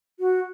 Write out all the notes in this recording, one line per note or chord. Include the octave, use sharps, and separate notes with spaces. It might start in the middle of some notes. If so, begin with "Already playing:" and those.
F#4